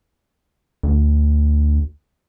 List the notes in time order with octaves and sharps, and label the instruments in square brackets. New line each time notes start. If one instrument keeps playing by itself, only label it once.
[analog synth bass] D2